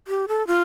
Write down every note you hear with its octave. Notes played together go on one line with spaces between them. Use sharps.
G4
A4
F4